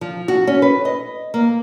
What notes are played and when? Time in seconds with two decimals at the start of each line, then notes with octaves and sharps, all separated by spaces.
0.01 F3
0.28 F#4
0.47 C#4
0.62 B4
0.85 D#5
1.34 A#3